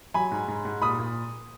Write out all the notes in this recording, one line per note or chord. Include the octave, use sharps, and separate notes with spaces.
F#3 G#5 B5
G#2
G#2
G#2
A#2 B5 D#6
A#2